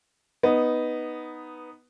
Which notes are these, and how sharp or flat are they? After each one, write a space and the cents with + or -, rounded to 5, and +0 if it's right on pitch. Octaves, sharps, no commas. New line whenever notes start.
B3 +0 D#4 +0